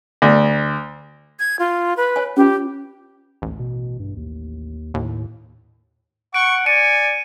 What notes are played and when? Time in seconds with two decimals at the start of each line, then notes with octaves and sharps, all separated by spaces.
0.22 D2
1.39 G#6
1.59 F4
1.97 B4
2.16 C#5 G#5
2.37 C#4 F4 G4
3.42 A1 D2
3.59 B2
3.99 G2
4.16 D#2
4.94 D#2 A2
6.34 F#5 C#6 D7
6.66 D5 G#5 C#7 D#7